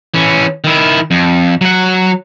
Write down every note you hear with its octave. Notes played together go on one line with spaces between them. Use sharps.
E3 C#4
D#3 E4
F2
F#3 F#5